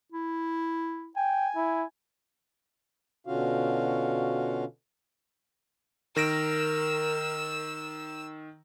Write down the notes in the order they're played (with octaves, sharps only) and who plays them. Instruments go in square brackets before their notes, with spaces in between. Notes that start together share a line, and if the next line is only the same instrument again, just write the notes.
[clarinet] E4
[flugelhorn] G5 [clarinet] G#5
[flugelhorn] E4
[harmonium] B2 D3 C#4 F4 F#4 F5
[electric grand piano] D#3 A#6 D7 [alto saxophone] A#4 [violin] E6